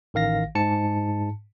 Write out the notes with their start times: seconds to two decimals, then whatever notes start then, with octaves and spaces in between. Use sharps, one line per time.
0.14 A1 D#3 F5 A#6
0.55 G#2 A5 C#7